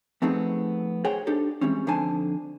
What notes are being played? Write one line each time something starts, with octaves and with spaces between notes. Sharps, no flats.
F3 A3 B3 C4 D#4 G#4
G#4 C5 C#5 F#5 G5
D4 D#4 G4 A4 C5
E3 G3 G#3 C4 C#4
F2 D3 D#4 C5 G#5 A5